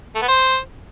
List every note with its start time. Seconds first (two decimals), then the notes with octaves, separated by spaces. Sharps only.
0.15 A3
0.22 B3
0.28 C5